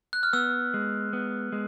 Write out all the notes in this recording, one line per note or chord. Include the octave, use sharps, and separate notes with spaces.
F#6
F6
B3 E6
G#3
B3
G#3